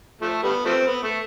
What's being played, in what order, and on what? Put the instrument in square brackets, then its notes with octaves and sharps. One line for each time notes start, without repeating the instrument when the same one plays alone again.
[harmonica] F3 A3
G3 B3
F3 A3 C4
B3
A3